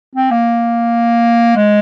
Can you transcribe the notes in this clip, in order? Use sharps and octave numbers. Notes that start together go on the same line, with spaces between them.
C4
A#3
G#3